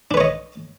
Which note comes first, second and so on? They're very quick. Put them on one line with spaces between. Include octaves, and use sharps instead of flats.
D4 B4 C#5 D#5